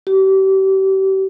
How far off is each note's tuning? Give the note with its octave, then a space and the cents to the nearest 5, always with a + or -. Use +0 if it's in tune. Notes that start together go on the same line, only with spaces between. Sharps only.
G4 -35